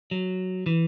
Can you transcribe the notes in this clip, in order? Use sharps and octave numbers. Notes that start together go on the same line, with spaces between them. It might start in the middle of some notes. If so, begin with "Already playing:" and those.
F#3
E3